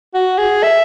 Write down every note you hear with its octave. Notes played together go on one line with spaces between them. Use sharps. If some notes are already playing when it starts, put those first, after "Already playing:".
F#4
G#4
E5